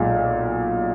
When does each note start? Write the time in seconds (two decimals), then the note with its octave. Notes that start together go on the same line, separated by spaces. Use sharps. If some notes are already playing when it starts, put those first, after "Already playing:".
Already playing: B1 A#2 G#3